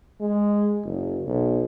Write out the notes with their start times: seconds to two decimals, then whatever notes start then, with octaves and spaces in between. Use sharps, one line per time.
0.21 G#3
0.85 F#1
1.26 B1